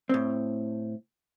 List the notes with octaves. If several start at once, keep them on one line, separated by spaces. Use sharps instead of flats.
A2 C4